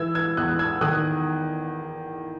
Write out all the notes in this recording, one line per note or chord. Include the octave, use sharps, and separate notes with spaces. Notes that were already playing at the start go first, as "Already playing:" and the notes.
Already playing: E3 E6 G#6
E6 G#6
E2 D#6 F#6
E6 G#6
D#3 D#6 F#6